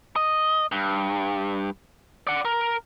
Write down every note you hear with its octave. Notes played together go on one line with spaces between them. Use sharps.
D#5
G2
D5 F#5
A#4